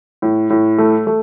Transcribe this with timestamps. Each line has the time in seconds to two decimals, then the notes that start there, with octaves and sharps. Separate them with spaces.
0.22 A2
0.50 A2
0.78 A3
1.07 A3